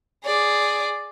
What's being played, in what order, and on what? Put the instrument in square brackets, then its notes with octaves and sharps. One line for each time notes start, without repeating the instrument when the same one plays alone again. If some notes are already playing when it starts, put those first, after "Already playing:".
[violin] G#4 D5